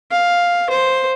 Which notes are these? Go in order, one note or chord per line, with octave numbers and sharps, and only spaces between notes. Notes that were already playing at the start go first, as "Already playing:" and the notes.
F5
C5